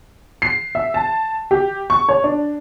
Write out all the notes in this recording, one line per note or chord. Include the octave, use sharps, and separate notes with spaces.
C7
E5
A5
G4
C#6
C#5
D4